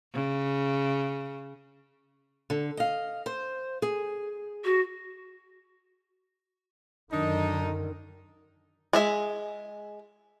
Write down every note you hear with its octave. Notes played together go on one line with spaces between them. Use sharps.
C#3
D3
D#5 F5
C5
G#4
F#4
F#2 D3 D#3 D4 D#4
G#3 G#4 E5